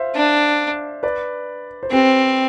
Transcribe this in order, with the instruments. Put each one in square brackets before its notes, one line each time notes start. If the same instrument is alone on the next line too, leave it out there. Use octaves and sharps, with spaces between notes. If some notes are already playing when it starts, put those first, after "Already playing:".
Already playing: [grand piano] C5 E5 F5
[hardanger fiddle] D4
[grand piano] B4 D5
C5
[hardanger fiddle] C4 [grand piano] G4 B4